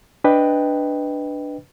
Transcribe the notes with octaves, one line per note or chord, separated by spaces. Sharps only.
D4 B4 D#5 G5